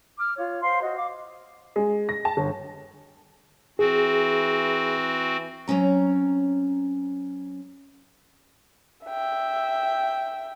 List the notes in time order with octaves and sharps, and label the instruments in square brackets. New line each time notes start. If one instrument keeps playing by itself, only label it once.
[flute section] D6 F6
F4 C#5
C5 F5 C6
F#4 C5 D#5
F5 D6
[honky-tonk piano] G#3
A#6
A5
G1
[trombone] E3 [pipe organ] C4 F#4 [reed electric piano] G#4
[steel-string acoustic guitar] F#3 C4 C#4 A#5
[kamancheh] E5 G5